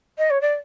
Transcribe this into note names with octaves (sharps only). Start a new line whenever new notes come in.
D#5
C#5
D5